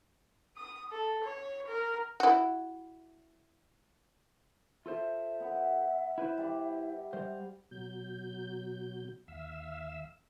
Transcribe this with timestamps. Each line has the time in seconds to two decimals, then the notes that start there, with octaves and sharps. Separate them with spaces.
0.57 D#6
0.91 A4
1.24 C#5
1.68 A#4
2.20 E4 F#4
4.86 F4 A4 C5 E5
5.40 B3 F#5
6.18 E4 B4 C5
6.38 G3 D5
7.13 G3 C5 F5
7.71 B2 F#3 G6
9.28 D#2 E5 F5 E6